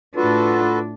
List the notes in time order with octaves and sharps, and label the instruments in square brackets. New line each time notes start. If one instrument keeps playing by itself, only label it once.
[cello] A2 D4 [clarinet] F4 [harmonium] F#4 A4 B4